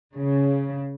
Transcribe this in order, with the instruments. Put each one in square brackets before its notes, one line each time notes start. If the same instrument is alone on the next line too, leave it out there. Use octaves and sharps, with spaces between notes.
[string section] C#3